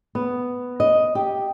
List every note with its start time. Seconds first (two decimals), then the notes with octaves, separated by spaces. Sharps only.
0.15 B3
0.80 D#5
1.15 G4